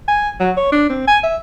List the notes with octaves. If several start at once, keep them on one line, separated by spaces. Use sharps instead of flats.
G#5
F#3
C#5
D4
C4
G#5
E5